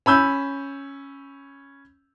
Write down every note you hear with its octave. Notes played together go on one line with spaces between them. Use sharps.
C#4 B5 E6 G6